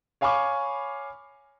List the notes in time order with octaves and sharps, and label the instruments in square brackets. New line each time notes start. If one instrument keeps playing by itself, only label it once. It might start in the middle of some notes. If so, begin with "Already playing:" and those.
[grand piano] C#5 F5 G#5 B5 C#6 D6